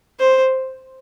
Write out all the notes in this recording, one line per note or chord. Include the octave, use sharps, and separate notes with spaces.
C5